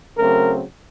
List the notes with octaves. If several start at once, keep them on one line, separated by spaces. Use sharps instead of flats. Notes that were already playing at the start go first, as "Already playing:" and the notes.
C#3 F#3 A3 C4 A#4